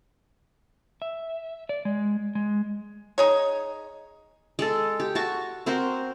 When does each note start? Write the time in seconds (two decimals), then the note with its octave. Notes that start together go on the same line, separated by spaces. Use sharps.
1.02 E5
1.69 D5
1.85 G#3
2.35 G#3
3.18 D#4 G#4 C#5
4.59 G#3 A4
5.00 G4
5.15 F#4 A5 C#6
5.66 C4 F#4 A#4 C5